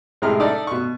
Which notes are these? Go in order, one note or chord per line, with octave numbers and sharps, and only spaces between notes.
A2 C3 G#3 G#4 A#5 F6
D#4 A4 D5 E5
B2 C#6